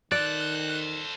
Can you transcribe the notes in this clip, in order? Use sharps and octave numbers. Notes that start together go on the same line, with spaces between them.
D#3 A4 C5 D5 F#6